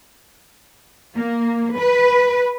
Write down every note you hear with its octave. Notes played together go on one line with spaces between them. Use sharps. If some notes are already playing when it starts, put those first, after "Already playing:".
A#3
B4